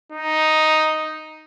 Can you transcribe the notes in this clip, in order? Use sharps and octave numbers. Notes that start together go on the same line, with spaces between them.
D#4